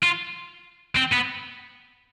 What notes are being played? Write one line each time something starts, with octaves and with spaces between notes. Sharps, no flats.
F4
C4
B3